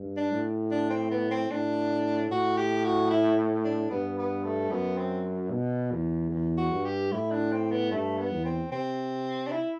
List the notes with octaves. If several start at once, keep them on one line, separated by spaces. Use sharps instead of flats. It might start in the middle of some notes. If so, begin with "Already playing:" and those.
Already playing: G2
D4
A2
D4
C4
B3
C4
A2 D4
A2 F#4
G4
F#4
E4
D4
G2 B3
B3
A3
F#2 B3
C4
B2
E2
E2
F#4
G2
G4
A2 E4
D4
C4
B3
G2 A3
B3
E2
C4
C3 C4
D4
E4